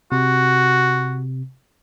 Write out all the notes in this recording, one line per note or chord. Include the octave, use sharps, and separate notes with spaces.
C3 F#4